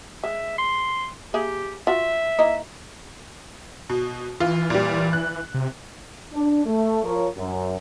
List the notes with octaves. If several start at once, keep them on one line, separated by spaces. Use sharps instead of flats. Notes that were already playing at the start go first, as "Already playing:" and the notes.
G#3 E5
C6
A#3 G4 G#4 E5
F4 F#4 E5
A#3 D#4 E4
B2
E3 F4
A#2 G3
F#6
C3
D4
A3
F3 F4 A#4 C#5
F#2